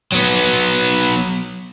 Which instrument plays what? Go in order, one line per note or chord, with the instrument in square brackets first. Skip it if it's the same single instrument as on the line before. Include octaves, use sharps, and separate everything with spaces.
[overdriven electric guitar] F#3 B3